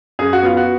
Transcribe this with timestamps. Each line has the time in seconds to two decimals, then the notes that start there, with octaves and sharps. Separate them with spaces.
0.19 F#2 G#4
0.33 F#4
0.43 B3 F4
0.57 F#4